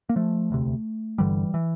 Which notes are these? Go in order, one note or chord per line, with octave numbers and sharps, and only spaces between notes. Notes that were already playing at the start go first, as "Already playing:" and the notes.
A#3
F3 A3
E1 D2 C3
G1 G2 D3 E3 G3
E3